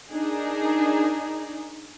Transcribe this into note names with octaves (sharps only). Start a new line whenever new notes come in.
D4 D#4 G#4 A#4